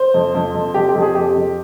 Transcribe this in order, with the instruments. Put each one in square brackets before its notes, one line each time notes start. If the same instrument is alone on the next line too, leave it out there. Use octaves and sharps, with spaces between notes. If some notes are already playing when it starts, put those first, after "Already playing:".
Already playing: [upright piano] C5
F2
F2
F2
F2 G4
G4
F2
G#4
F2 G4
F2